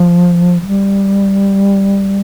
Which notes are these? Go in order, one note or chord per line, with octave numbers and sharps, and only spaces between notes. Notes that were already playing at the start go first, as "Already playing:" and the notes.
Already playing: F3
F3
G3